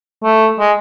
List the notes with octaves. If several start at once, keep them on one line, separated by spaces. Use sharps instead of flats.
A3
G#3